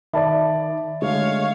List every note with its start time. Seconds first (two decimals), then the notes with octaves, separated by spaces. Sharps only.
0.13 D#3 D5 E5 A5 B5
1.02 D3 G#3 A3 C#5 F5